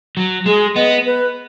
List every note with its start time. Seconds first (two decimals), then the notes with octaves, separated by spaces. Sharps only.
0.17 F#3
0.46 G#3 G#4
0.75 B3 D#5
1.06 B4